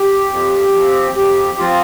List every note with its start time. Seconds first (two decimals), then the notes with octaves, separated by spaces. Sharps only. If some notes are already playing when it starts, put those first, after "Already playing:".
Already playing: G4
0.31 F2
0.74 F3 C4
1.16 F2 G4
1.58 F3 C4 F4